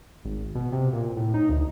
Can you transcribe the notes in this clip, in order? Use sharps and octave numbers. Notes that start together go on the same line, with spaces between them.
G#1
B2
C3
A#2
A2
D#4
D2